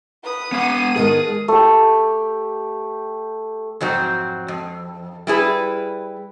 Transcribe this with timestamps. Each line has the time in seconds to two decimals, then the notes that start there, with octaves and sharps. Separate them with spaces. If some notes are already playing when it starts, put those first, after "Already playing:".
0.23 B4 D#6
0.52 B3 F5 F#5 D#7
0.96 D#3 G#3 B3 G#4 A5
1.48 A3 G4
3.81 F2 G#2 F#3 C4
4.48 F2
5.27 G3 E4 G#4 B4